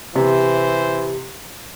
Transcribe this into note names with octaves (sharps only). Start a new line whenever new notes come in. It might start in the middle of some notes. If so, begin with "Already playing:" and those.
C3 E3 G4 C5